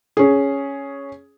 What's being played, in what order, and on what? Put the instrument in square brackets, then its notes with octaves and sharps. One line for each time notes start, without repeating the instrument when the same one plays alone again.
[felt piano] C#4 G#4